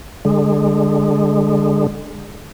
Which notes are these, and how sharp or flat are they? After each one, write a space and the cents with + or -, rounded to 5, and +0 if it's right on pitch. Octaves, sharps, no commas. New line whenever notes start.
D3 +0 G#3 -25